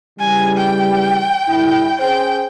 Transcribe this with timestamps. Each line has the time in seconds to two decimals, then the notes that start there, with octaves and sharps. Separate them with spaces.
0.19 C#3 E3 G3 G#5
0.56 G5
1.48 G2 D3 E4
2.00 C#4 G#4 C5 G5